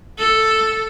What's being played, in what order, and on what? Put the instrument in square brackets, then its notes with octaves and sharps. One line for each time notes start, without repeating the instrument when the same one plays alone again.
[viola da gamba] A4